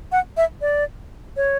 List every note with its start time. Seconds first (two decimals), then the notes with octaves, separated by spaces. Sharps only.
0.12 F#5
0.37 E5
0.61 D5
1.37 C#5